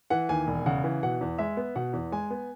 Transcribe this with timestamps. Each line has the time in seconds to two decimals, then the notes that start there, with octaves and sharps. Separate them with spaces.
0.10 E3 F#5
0.29 D#2 G#5
0.47 E1
0.66 C#3 F#5
0.84 E3
1.03 B2 F#5
1.21 E2
1.38 G#3 E5
1.57 B3
1.76 B2 F#5
1.93 E2
2.12 G#3 G#5
2.30 B3